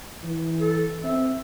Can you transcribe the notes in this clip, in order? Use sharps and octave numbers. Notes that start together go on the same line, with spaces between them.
E3
A4
C4 E5